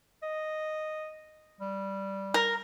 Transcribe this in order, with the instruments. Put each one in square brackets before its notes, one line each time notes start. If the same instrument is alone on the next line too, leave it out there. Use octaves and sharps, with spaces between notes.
[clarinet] D#5
G3
[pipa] A#4